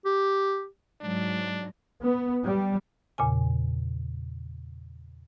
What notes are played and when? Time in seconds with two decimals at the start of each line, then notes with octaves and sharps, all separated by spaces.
0.06 G4
1.01 G#2 F#3 D4
2.02 B3
2.45 G3
3.18 E2 A#2 C#3 G#5